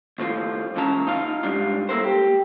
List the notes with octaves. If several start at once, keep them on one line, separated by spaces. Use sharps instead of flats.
D#2 A2 F3 F4
C#2 A#2 E3 C#4 A5 A#5
D#4 F4 F5
G#2 B2 G3 D4 F4
A#3 E4 A4 A#4 C5
G4